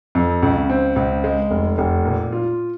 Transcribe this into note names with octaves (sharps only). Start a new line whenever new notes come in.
F2
C#2
C4
C#2
G#3
F1
F1
A#2
F4